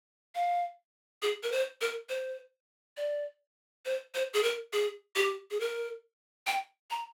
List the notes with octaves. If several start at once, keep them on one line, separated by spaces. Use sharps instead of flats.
F5
G#4
A#4
C5
A#4
C5
D5
C5
C5
G#4
A#4
G#4
G4
G#4
A#4
G5
A#5